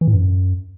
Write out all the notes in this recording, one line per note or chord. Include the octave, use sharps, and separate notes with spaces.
E3
A2
F#2